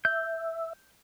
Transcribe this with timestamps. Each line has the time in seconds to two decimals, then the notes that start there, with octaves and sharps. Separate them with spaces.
0.05 E5 G6